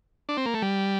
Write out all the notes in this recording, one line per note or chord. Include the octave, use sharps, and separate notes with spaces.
D4
C4
A#3
A3
G3